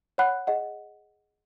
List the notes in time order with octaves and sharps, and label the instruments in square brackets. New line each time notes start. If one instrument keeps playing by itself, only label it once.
[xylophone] C#5 F#5 B5 F#6
G#4 D#5 F#5